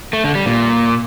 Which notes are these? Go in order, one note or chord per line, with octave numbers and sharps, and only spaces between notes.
A3
D3
G3
A#2